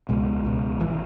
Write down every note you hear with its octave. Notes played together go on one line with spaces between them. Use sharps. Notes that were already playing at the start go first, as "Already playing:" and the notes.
C#2 B2 G#3
C#2 B2
G#1 E3